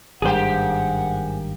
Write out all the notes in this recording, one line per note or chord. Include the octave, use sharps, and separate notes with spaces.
G#1 G2 A#3 G4 G#4 C5 F#5